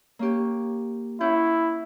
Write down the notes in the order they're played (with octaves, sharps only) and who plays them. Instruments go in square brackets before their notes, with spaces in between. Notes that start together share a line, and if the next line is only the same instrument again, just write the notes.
[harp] A#3 C#4 G4
[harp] C#4 F#5 G6 [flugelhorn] E4